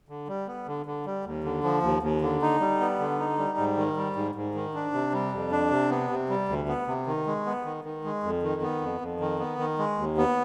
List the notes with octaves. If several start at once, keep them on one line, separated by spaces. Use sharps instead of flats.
D3
G3
B3
D3
D3
G3
D#2
D3
F3
D#2
D#2
D3
D#4
G3
B3
D3
D#4
G3
G#2
D#3
G3
G#2
G#2
D#3
D4
C3
G3
F2
D4
C3
B3
C3
G3
D2
B3
C3
D#3
G#3
B3
D#3
D#3
G#3
F2
D#3
B3
F2
F2
D#3
B3
D#3
G#3
D#2
B3